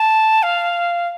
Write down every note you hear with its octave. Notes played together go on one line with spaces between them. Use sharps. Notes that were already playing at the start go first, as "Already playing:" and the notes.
Already playing: A5
F5